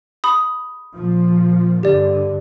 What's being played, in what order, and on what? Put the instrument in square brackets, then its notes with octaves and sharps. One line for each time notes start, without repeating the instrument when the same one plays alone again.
[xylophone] B5 D#6
[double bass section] A#2 F3
[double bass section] G2 D3 [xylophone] G4 D5